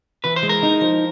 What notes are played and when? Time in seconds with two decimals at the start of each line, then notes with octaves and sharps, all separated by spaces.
0.24 E3 B4
0.36 C5
0.43 G#3
0.49 A#4
0.63 D#4
0.81 F3